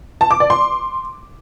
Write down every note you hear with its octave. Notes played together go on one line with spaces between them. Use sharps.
A5
D6
D5
C6